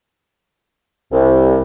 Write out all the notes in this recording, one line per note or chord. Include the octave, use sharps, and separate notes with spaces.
C2